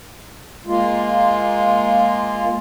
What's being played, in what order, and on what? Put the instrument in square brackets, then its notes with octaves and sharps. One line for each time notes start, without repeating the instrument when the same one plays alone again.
[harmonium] G#3 A#3 F4